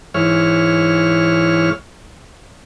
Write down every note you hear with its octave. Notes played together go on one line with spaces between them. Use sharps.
G#2 E3 C#5 F6